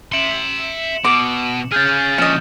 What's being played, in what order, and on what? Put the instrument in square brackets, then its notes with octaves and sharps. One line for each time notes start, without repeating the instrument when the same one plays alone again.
[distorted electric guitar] E5 C6 [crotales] C#7 E7 F#7
[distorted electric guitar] B2 [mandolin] D6
[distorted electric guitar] C#4 G#4 [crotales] F6 G6 A6
[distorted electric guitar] F2 A#2 [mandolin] C#4 D#5 [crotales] F6 A6 E7